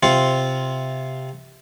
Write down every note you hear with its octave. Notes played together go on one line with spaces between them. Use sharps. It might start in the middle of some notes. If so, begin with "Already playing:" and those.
C3 C4 F4